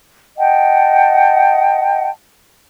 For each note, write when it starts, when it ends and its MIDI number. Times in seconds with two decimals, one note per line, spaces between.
0.39 2.09 75
0.39 2.09 78
0.39 2.09 79
0.39 2.09 81